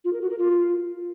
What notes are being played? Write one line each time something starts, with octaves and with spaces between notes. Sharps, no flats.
F4
A#4
F#4
A#4
F4